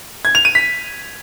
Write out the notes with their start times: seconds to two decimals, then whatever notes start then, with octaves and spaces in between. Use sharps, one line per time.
0.25 G#6
0.35 F7
0.45 D#7
0.55 B6